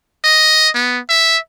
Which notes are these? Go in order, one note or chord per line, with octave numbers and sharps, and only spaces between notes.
D#5
B3
E5